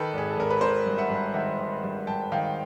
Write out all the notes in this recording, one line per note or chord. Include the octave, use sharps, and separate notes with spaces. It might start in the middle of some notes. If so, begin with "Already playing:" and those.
Already playing: D#3 A4 B4
G#1 G#4
A4
G#1 A#4
B4
G#1 A#4 C5
G2
E5 F#5
G2
D#3 E5 F#5
D#3
G2
G2 G5 A5
D#3 F5 G5